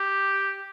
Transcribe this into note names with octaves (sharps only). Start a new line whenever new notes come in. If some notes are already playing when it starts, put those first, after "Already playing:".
Already playing: G4